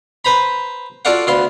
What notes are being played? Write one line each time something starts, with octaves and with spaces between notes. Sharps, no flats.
B4 C5 A#5 B5
F4 F#4 A4 D5 F5 F#5
D2 B3 F5 C6